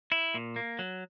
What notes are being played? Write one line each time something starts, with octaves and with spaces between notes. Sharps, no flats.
E4
A#2
A#3
F#3